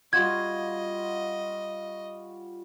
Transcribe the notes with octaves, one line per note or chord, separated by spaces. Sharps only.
G3 F4 F#4 D#5 G#6